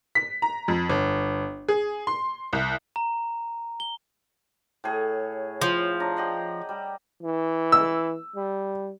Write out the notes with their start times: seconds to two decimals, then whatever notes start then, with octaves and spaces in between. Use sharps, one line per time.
0.15 B6
0.42 A#5
0.68 F2
0.89 G1
1.68 G#4
2.07 C6
2.53 C2
2.96 A#5
3.80 G7
4.84 A2 G#4 C#5
5.62 F3
6.00 D4 A#5
6.17 G4 D#5 F#5
6.69 G3
7.23 E3
7.72 E6
8.35 G3